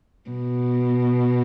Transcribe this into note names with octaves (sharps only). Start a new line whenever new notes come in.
B2